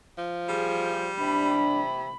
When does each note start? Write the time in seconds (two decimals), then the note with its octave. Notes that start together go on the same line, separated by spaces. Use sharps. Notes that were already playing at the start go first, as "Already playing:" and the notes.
0.18 F3
0.49 G3 G#4
1.19 C3 D4 B5